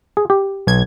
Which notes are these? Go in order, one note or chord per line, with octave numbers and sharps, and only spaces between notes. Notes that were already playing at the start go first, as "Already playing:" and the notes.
G#4
G4
B1 G#6